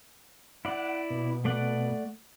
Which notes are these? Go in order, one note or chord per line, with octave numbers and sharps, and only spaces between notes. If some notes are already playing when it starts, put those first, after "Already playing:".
E4 D5 F#5
B2
A3 D5 F#5